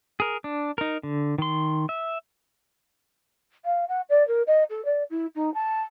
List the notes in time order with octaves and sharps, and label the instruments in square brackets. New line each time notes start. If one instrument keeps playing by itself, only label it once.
[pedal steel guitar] G#4 A#4
D4
D#4 A#4
D3
D#3 C6
E5
[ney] F5
F#5
D5
A#4
D#5
A4
D5
E4
D#4
A5